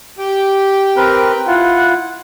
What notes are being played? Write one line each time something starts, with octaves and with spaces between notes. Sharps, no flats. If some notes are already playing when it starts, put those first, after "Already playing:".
G4 G5
C4 A#4 B4
E4 F4 F#5